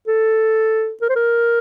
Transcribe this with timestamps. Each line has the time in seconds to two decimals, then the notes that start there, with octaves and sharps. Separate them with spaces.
0.08 A4
1.02 A#4
1.09 C5
1.16 A#4